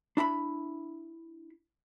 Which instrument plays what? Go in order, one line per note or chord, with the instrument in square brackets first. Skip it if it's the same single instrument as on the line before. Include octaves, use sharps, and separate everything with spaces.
[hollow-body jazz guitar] D4 E4 A#5 B5